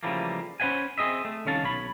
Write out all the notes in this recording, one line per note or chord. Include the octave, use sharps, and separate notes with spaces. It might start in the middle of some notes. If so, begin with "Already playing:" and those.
C#3 E3 F3 G3 A3 A#3
C#4 B4 C5 E5 F#5 G#5
C4 G#4 D#5 E5
A3
C2 D#3 C#4 F5 A5
B1 C#5 B5